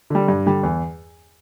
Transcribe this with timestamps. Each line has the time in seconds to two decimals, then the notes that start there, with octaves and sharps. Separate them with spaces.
0.10 D3 G3
0.28 G2
0.46 D3 G3
0.63 E2